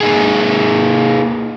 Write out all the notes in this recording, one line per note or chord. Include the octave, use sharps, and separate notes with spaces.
A#3 D#4 G#4